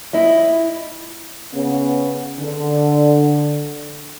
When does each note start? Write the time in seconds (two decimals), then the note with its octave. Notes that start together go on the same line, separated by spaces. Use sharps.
0.13 E4 D#5 E5
1.54 C#3 B3 C#4
2.39 D3